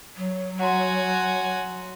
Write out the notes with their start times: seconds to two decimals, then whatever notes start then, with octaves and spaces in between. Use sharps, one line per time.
0.16 F#3
0.59 F#4 F#5 G#5 A#5 C6